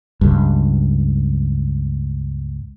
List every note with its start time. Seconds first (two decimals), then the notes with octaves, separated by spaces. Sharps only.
0.21 C#2 G2